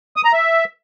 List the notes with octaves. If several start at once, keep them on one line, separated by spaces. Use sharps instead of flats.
D#6
A#5
E5